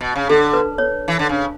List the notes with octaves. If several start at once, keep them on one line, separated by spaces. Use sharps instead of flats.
B2
C#3
D3 A4
B4
C#5
E3
D3
C#3